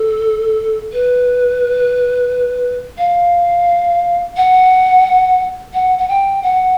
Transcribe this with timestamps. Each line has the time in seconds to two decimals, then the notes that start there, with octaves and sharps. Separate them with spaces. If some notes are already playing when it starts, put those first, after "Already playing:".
Already playing: A4
0.93 B4
2.98 F5
4.37 F#5
5.74 F#5
5.99 F#5
6.08 G5
6.43 F#5